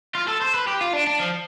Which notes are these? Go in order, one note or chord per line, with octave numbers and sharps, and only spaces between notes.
F4
A4
C5
B4
G4
F4
D4
D4
F3